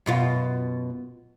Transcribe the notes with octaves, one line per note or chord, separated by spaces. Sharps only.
F#2 B2 F4